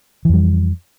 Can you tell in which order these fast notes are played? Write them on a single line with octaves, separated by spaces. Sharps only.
E3 F2 G3